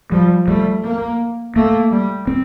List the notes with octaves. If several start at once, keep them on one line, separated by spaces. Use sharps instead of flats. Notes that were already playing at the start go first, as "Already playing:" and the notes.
F3 G3
G3 A3
A#3
A3 A#3
G3
C4